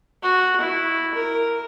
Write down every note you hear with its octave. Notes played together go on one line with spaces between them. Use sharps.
F#4
E4
A#4